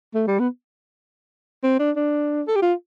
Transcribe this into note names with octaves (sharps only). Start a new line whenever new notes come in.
A3
G3
B3
C4
D4
D4
A4
G4
F4